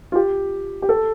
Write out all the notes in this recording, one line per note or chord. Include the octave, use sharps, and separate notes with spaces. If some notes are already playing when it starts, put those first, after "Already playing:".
F4
G4
G4
A4